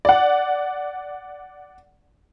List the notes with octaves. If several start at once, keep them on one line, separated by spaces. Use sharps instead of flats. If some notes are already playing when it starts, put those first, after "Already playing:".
D5 F#5